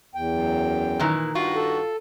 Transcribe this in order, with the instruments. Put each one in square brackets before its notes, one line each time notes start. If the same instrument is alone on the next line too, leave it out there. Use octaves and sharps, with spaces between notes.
[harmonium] E2 G5
[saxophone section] F#2
[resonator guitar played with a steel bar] A#2 D#3 E3
[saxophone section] G2 D#3 F#4 [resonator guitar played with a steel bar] F4
[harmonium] A4